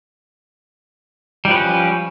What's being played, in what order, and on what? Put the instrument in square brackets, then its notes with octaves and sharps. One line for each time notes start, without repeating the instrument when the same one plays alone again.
[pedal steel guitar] G3
F3
B4
C#4